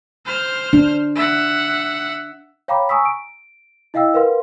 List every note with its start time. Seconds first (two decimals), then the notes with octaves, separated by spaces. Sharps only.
0.25 C5 F6
0.73 D4
1.15 E5 F#5
2.68 C#5 F5 G5 A#5 B5 D6
2.89 G#5 A#5 C#6 D#6 E6 B6
3.05 D7
3.94 E4 D#5 F5 G5 E6
4.14 A#4 B4 F5 F#5 C6